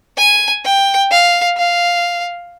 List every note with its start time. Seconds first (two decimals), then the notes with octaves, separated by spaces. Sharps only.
0.17 G#5
0.64 G5
1.11 F5
1.57 F5